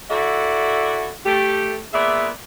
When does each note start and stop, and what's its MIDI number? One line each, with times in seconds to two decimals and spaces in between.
0.11 1.12 64
0.11 1.12 66
0.11 1.12 69
0.11 1.12 74
0.11 1.12 76
0.11 1.12 78
1.26 1.79 57
1.26 1.79 67
1.93 2.29 46
1.93 2.29 59
1.93 2.29 68
1.93 2.29 74
1.93 2.29 76